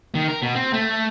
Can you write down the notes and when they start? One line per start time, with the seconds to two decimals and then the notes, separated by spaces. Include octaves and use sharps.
0.15 D#3
0.28 A#4
0.42 B2
0.55 C4
0.73 A3